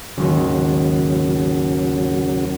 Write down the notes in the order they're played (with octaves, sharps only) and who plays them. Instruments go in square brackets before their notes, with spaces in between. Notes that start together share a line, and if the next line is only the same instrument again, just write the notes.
[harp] G#1 D#2 [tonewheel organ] C#3 F#3